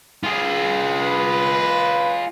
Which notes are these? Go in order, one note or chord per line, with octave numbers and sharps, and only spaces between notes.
F4 G#4
B4